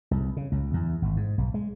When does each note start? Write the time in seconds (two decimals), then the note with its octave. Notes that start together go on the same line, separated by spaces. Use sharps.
0.11 C2
0.37 C#3
0.52 C#2
0.74 E2
1.02 G#1
1.17 G#2
1.38 B1
1.54 G#3